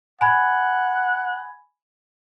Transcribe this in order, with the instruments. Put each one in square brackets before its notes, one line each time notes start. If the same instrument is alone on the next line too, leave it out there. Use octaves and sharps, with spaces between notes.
[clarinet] F#5 [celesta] G#5 B5 G#6